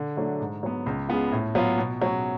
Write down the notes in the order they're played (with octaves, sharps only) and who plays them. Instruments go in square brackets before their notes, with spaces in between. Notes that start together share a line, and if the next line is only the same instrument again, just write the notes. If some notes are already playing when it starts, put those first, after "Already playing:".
Already playing: [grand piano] D3
F#3 A3 D4
G#2
F#3 B3
C#2
C#3 G#3 B3 F4
A2
F#3 B3 F4
B2
F#3 C#4